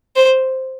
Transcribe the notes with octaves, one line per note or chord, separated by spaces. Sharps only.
C5